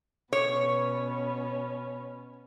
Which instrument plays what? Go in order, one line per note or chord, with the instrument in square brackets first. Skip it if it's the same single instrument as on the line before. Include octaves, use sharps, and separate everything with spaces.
[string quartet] B2 B3 C#4 [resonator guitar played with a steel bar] C#5